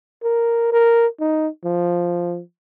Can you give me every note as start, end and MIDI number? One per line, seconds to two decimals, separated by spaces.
0.23 0.68 70
0.72 1.07 70
1.20 1.48 63
1.65 2.41 53